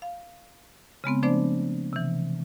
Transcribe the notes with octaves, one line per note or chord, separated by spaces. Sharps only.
F5
C#3 G#3 B3 C4
F3 A3 B3 D4 C5 D5
C3 E3